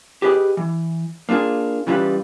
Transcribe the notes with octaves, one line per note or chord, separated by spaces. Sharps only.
G4 G#4 B4 C#5 D#5
E3
A#3 D4 F4 G#4
C#3 E3 G3 F4 G#4 B4